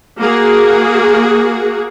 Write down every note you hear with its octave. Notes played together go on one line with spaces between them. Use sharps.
A#3 F#4 G#4